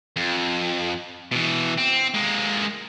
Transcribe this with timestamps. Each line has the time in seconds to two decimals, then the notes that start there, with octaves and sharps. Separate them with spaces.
0.17 F2
1.32 B2 E3
1.78 C4
2.14 G#3 A#3